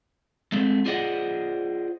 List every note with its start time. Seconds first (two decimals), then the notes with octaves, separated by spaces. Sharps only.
0.52 G#3 A3 C4
0.86 F4 G#4 C5 D5 D#5 F#5